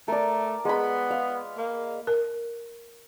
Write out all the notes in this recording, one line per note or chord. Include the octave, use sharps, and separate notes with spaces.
A3 A#4 D5
G#3 B3 B5
F5
A#3
A#4